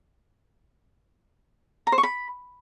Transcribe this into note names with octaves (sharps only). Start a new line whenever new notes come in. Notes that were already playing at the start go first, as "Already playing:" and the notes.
A#5
C5
C#6
B5